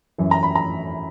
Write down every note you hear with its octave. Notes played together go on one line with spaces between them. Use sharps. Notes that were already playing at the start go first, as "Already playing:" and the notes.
F#2 E3
A#5
B5
A#5